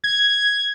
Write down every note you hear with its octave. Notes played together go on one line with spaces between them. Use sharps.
G#6